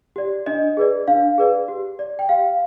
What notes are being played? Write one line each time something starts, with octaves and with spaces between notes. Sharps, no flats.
G4 D5
D4 D#5
G#4 B4 D5
D4 F5
G#4 B4 D5
G4
D5
G5
G4 F5